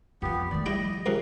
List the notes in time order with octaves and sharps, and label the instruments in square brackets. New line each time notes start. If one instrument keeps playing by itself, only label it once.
[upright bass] F2 F3 [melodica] B3 G4
[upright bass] D#3 A3 [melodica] D5
[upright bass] F3 [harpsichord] G3 E4 G5 [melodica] D#5
[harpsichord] C#2 F#2 C3 [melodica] F5